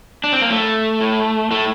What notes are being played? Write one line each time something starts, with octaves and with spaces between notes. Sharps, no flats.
D4
C4
A#3
A2 A3
A2
A2 A3